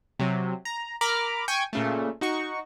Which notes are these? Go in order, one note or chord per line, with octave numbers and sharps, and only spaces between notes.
C3 F#3
A#5
A#4 A#5 B5 D6 F6
G5 G#5 C#6
A#2 C#3 A3
D#4 F#4 C#6